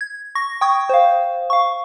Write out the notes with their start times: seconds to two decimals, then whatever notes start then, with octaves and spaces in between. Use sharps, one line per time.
0.01 G#6
0.35 C#6 A#6
0.61 G5 C#6 D#6 G#6
0.89 C5 F5
1.50 F5 C#6